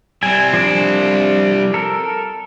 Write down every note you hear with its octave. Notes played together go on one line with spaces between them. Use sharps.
G3 C4 G#5
F3 D4
A4 A#4